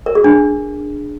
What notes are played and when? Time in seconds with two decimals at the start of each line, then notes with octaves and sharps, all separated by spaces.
0.06 A#4
0.15 G#4
0.24 D4